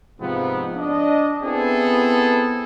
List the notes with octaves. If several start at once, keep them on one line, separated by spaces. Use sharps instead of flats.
G#2 C3 F3 B3 C4
D4 D#5
B3 C4 E4 G#4 A4